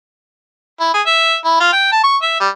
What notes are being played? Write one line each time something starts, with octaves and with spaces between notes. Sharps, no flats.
E4
G#4
E5
E4
F4
G5
A5
C#6
E5
G3